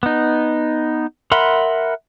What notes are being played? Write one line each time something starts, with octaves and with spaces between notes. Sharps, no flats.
B3 D#4
A#4 E5 F#5 B5 C6